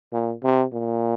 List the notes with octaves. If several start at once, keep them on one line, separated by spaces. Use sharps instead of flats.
A#2
C3
A#2